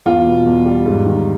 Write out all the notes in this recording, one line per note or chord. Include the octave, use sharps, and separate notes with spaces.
E2 F4
B2
E2
G3
G#2
D#3